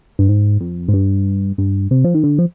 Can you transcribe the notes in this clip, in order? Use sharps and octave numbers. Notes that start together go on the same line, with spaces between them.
G2
G#2
F2
G#2
G2
G2
C3
F3
D#3
D3
F3